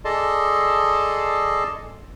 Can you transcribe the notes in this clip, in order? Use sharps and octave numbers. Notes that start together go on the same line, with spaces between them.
G#4 A4 D5 D#5 A5 C6